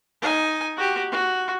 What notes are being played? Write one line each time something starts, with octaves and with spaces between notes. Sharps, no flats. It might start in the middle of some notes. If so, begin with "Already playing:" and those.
D#4 G#5
F#4 G4
F#4